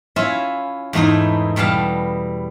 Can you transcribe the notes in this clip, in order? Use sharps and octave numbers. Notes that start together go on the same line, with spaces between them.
C#4 E4 F4 E5 G#5
E2 G#2 A3 D#4 E4
E2 B2 G3 F5 A5